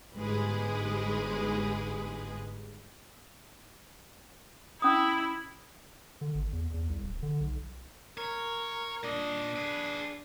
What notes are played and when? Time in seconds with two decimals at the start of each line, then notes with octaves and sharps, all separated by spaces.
0.17 G1 G#2 G#3 G4 G#4 B4
4.82 C#4 E4 D#6
6.21 D3
6.35 G#1
6.53 E2
6.74 E2
6.89 C2
7.03 D1
7.23 D3
7.41 B1
8.17 A#4 C#5
9.03 A#2 D4 D#5
9.56 G#4 B4